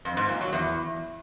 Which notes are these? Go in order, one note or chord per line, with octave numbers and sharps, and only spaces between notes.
F2
G#2
A#2
F#3
E2